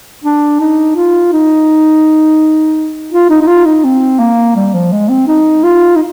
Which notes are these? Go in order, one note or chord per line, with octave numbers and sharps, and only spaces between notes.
D4
D#4
F4
D#4
F4
D#4
D#4
F4
D#4
C4
A#3
G3
F3
G#3
C4
D#4
F4
D#4